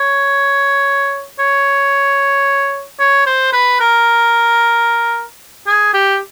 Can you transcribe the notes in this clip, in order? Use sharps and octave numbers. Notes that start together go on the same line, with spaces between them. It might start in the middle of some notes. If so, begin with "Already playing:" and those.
Already playing: C#5
C#5
C#5
C5
B4
A#4
G#4
G4